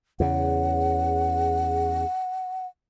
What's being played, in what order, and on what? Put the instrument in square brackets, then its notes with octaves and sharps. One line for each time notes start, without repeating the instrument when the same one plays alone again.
[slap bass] E2 C#3 [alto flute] F#5